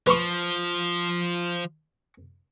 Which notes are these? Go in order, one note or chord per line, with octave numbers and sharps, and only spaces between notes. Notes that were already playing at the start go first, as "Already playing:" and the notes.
F3 B4 C6 C#6